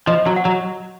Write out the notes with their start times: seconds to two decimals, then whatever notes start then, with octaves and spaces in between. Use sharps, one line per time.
0.07 F3 D#5
0.26 F#3
0.36 F#5
0.45 F#3